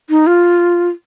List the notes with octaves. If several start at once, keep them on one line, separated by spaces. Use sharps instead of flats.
D#4
F4